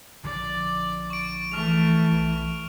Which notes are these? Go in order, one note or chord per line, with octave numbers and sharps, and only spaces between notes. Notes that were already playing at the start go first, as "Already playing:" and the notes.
A#1 D3 F3 D5
C#6 D7
E3 A3 C#6 F6 F7
B1